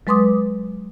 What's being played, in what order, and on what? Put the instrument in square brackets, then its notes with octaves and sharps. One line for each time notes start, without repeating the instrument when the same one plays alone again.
[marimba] F#3 G#3 B4 C6 D6 D#6